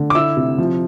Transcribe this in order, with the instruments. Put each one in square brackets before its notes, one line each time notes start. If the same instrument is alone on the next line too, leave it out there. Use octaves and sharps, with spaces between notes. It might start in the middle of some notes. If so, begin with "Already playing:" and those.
Already playing: [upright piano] D3
D6
E4 E6
C3
F3